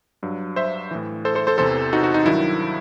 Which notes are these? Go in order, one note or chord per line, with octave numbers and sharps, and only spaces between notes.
G2 F#3
C5 E5
A2 E3
A4 C5
A4 C5
A4 C5
E2 C3 E3 A4 C5
D#4 F#4
D#4 F#4
D#4
G2 D#3 F#3 E4